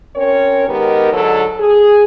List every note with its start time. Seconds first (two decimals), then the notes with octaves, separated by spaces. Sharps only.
0.16 C4 C#4 A#4 C#5
0.67 D#3 G#3 B3 G4 A#4
1.11 G#2 D3 F#3 A4
1.59 G#4